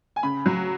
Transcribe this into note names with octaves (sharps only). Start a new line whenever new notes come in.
G#5
C#3 B5
F#3